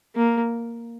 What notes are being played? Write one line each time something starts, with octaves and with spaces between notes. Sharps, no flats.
A#3